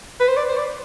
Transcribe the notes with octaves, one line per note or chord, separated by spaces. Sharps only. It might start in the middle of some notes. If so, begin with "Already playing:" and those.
B4
C5
D5
C5
D5